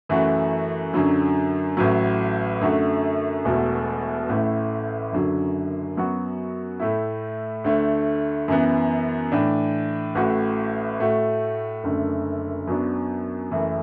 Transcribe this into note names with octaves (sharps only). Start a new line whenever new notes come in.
F#2 E3 A3 F#4
F#2 D3 F#3
A1 A2 F#3
F#2 D3 A3 F#4
E1 E2 B2 A3 F#4
A1 A2 A3 E4
F#1 F#2 D3 F#3
F#2 F#3 B3 F#4
A2 A3 E4
D2 D3 A3
F#2 E3 B3
A2 E3 D4
A1 A2 A3 F#4
A2 A3 F#4
F#1 F#2 D3 A3
F#2 F#3 B3 D4
F#1 F#2 E3 A3